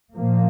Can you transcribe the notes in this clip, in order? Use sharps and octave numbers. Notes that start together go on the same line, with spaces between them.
A#2 F3 A#3